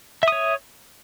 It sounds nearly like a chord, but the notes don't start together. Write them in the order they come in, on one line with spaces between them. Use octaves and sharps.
E5 D#6 C#5